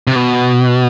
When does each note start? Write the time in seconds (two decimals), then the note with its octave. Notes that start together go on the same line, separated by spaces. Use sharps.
0.07 C3
0.16 B2